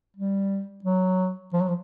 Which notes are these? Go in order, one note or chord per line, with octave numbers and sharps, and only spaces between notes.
G3
F#3
F3
F#3
F3